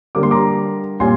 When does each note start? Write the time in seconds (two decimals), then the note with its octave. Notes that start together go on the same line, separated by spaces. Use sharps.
0.15 D3 G3 A#3 D6
0.23 C6
0.31 A#5 D6
1.00 A#2 G3 G#5 C6